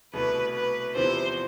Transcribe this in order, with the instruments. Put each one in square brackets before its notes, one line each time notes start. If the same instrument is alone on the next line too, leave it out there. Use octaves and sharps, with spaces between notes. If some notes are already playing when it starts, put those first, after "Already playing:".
[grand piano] C2 B2 A3 [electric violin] B4
[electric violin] B4
[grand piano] E2 C3 F3 B3 E4 [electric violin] C5